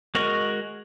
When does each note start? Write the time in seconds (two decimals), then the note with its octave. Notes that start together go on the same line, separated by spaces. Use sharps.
0.15 G#3 F#4 A#4 D#5 C#6